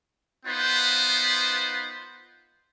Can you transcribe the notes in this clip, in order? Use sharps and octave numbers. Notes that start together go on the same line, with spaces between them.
B3 D#4 F4 B4 C5